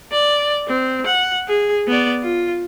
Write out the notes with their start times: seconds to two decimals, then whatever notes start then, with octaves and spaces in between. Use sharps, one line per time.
0.12 D5
0.68 C4
1.06 F#5
1.48 G#4
1.87 B3 D5
2.22 F4